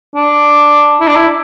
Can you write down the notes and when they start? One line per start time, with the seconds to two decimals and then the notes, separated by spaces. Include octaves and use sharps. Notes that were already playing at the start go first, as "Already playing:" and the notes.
0.15 D4
1.01 E4
1.08 D4
1.16 E4